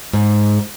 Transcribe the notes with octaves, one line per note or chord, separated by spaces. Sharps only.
G#2